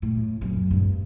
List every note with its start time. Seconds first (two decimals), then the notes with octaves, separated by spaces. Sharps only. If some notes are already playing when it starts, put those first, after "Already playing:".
0.02 A2
0.41 F#2 C3
0.71 G2